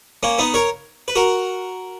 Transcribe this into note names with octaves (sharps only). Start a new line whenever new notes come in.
A#3 C#4
B3 D#4
A#4 C#5
B4
F#4 A#4